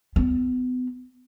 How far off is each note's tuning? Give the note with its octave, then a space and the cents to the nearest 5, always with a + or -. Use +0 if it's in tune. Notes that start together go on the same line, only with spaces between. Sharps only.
B3 +35